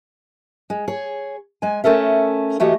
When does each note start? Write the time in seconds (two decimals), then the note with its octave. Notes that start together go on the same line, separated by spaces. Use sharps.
0.70 G#3
0.88 G#4 C#5
1.62 G#3 G#5
1.84 A3 C#4 A4 A#4 E5
2.60 E3 A3 F#4 G4 D#5